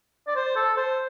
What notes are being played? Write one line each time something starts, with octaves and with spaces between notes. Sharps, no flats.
D5
C5
A4
C5